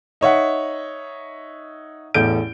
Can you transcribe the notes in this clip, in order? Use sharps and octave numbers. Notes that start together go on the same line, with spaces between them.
D#4 C#5 E5 F#5
A1 E2 A3 G6 D7